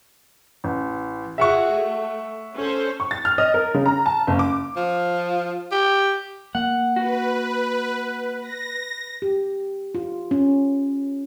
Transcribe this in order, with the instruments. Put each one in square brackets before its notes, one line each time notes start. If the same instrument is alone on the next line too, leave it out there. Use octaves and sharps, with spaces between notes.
[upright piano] A1
[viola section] F4 F#4 G#4 [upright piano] E5 F#5 C#6
[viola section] A3
C#4 A4 C5
[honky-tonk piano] C#6
A6
F6
D#5
A#4
C#3
A#5
A5
F#1
D6
[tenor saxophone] F3
G4
[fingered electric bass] A#3 [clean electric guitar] F#5
[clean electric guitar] F#4 [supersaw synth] B4
[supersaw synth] A#6
[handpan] G4
F4
C#4